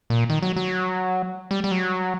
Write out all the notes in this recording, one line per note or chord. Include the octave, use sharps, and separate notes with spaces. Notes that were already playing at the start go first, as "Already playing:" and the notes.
A#2
D#3
F#3
F#3
G3
G3
F#3